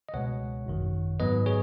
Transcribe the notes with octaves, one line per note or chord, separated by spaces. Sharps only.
D#5
C#2 B2 G#3 C#5 F#5
G#1 F#2 D#3
G#2 F#3 B3 B4 D#5
G#4 C#5